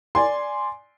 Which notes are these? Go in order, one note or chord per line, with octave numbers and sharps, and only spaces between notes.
D5 G#5 C6